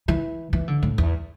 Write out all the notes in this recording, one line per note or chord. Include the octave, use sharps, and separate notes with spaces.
E3
E3
D3
A2
E2